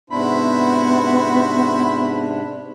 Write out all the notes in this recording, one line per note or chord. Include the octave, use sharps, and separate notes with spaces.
G#2 C3 B3 D4 E4 F#4 C5 B5